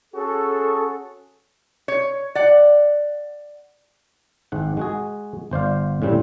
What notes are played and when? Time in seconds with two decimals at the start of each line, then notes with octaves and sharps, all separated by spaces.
0.14 C#4 F#4 G#4 A4
1.88 C#5
2.35 D5 F#5
4.52 G#1 G#2 F#5
4.77 G#3 F#4 G#4
5.51 G1 C5 D5 F5
6.02 A2 C#3 G3 C4